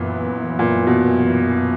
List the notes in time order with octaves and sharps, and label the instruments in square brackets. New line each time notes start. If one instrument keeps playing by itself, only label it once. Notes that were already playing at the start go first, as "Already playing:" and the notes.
Already playing: [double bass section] F#2 E3 B3 [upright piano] A#2
[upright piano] A#2
B2